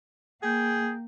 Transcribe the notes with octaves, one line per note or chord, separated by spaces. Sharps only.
A#3 G#4 G5